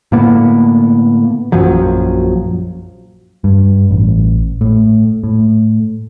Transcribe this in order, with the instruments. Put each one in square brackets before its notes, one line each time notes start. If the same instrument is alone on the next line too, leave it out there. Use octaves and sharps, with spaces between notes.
[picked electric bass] A2 D3 A#3 B3
A#1 F#2 F3 F#3
G2
A1
A2
A2